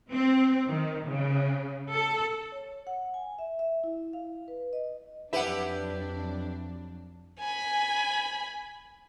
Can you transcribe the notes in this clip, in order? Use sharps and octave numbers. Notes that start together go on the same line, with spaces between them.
C4
D#3
C#3
A4
C#5
F#5
G#5
E5
E5
E4
F5
B4
D#5
F2 F#3 D4 E4 G4 B4 E5 F#5
G#5 B5